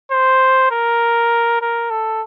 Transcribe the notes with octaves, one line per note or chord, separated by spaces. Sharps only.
C5
A#4
A#4
A4